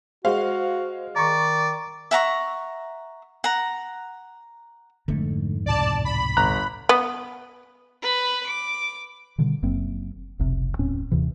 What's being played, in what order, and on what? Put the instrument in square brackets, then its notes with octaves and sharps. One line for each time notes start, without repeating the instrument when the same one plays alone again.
[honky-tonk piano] G#3 F5 [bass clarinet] F#4 [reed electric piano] C5
[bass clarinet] D#3 [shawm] D5 [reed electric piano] A#5 C#6
[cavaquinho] E5 F#5 A#5 C#6
F#5 A#5
[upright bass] F2 G#2 [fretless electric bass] D3 A3
[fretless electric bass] C#2 A2 C3 [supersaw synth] D5 A5
[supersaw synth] B5
[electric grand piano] G1 A#5 F#6
[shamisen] B3
[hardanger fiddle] B4 B5
D6
[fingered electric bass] B2 D3 D#3 G3
F#1 F#2 A#3 C4
F1 B1 C3
D#1 A2 C4 C#4
D#2 C3 E3